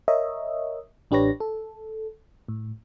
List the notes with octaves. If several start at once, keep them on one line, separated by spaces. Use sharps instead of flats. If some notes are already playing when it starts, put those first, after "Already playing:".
A#4 C#5 D#5 E5
A1 D4 G4 B4 C#5 A#6
A4
A2